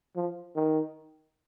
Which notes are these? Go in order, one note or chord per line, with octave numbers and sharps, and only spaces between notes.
F3
D#3